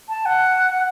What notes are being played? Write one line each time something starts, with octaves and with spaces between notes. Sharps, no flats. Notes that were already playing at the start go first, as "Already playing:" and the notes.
A5
F#5